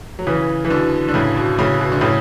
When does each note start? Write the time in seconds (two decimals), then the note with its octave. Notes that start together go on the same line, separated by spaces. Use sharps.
0.19 F#3
0.27 C#3 E3
0.65 E3
0.70 B2 D3
1.08 D3
1.14 A2 C#3
1.36 B2
1.58 A2 C#3
1.79 B2
1.92 D3
2.01 A2 C#3